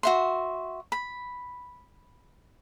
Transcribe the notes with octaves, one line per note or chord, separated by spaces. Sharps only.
F#4 E5 C6
B5